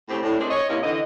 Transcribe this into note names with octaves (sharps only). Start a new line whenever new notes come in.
A2 C#3 C4 G4
A2 D4
G#3 C4 D4 D#4 G#4 A#4
C#5 D#5
C3 D#3 A#3 C#4 D#4 E4
D3 E3 D#5